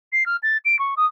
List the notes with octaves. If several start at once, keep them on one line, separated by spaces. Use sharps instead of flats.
C7
F6
A6
D7
C#6
D#6